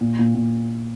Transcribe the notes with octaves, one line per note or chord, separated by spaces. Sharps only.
A#2
A#2
A#2